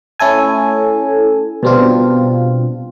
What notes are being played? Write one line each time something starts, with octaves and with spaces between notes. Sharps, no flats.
A3 C#4 E4 A4 G#5
B2 G3 C4 D4 F4